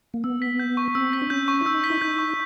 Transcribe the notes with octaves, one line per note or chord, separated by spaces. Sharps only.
A#3
B3 E6
B6
G6
C#6
C4 E6
B6
D4
C#4 G6
C#6
E4
D#4 E6
B6
E4
D#4 G6
C#6